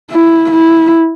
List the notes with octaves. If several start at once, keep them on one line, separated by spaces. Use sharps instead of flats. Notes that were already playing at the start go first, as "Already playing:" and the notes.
E4
E4